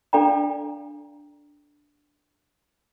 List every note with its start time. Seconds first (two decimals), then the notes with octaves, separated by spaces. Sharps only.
0.13 D4 A4 D5 F5 G5 A#5